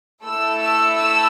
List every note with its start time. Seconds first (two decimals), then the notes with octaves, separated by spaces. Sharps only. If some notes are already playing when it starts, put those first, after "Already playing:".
0.23 A3 E4 A4 E6
0.60 E6
0.96 E6